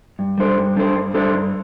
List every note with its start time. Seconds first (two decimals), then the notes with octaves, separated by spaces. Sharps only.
0.19 G2
0.38 G3 D4 A4 C5
0.58 G2
0.76 G3 D4 A4 C5
0.96 G2
1.14 G3 D4 A4 C5
1.33 G2